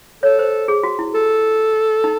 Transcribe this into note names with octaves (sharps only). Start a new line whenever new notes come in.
A4 C#5
C5
G#4
F#4
E4
A4
D#4